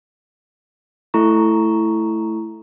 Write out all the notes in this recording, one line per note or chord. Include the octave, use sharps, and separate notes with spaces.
A3 E4 A4 A#5 C#6